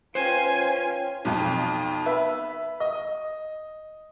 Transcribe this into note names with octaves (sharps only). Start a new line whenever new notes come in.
C#4 F4 B4 C5 G5 G#5
B1 F2
B4 E5
D#5